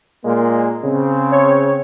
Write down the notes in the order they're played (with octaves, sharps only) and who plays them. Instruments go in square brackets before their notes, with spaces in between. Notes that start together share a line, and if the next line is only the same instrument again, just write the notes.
[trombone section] A#2 G#3 A#3
C#3 C4
[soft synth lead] C#5